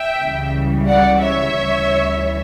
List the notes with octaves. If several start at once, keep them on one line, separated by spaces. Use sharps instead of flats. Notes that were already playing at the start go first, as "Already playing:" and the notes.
Already playing: E5 G5
C#2 C#3 E3 G3
D5 F#5
C#5 E5
D2 C#3 E3 G3